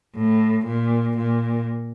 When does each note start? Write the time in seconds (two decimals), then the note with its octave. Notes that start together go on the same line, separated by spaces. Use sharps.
0.15 A2
0.66 A#2
1.17 A#2